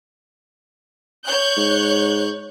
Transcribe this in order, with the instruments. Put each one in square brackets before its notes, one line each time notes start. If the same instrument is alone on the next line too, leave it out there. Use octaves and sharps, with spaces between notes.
[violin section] C#5 F#6 G6
[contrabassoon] G#2